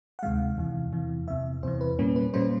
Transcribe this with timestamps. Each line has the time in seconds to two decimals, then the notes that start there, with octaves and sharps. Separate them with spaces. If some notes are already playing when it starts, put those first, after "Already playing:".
0.19 F#5
0.23 D2 C3 D#3 G#3 F5
0.58 E2 C3 E3
0.93 E2 C3 E3
1.28 E2 C3 E3 E5
1.63 E2 C3 E3 C5
1.81 B4
1.99 A#2 G3 A#3 C#4
2.16 B4
2.34 A#2 G3 A#3 C#4 C5